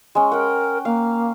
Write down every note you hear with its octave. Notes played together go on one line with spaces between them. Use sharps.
G#3 C#4
A#4 F#5 G5
A#3 F5